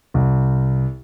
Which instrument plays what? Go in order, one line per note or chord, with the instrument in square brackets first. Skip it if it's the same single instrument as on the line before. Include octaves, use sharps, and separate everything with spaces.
[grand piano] C2